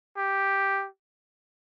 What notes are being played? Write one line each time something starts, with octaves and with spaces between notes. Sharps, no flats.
G4